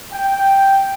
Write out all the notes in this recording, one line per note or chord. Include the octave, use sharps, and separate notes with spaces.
G5